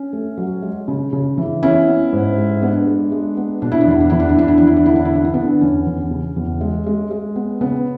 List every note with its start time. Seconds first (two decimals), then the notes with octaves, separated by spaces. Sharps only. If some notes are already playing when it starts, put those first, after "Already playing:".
Already playing: C#4
0.13 A3
0.38 F#3
0.62 G#3
0.88 C#3
1.13 C#3
1.38 E3
1.63 B3 C#4 E4
1.87 B3
2.13 G#2
2.38 G#3
2.62 G#3 B3 D4
2.87 G#3
3.12 G#3
3.37 B3
3.62 B2 D4
3.72 E4
3.81 D4
3.87 E2 E4
4.00 D4
4.10 E2 E4
4.20 D4
4.29 E4
4.37 E2 D4
4.48 E4
4.57 E2 D4
4.67 E4
4.76 D4
4.86 D3 E4
4.96 D4
5.05 E4
5.12 D3 D4
5.25 E4
5.34 D3 B3 D4
5.61 E2 C#4
5.87 E2
6.11 C#3
6.36 E2
6.61 G#3
6.86 G#3
7.11 G#3
7.36 B3
7.61 C#3 B3